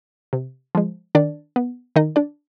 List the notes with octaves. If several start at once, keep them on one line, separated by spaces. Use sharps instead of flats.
C3
F3 G#3
D#3 D4 D5
B3
D#3 D#4 D#5
D4 D5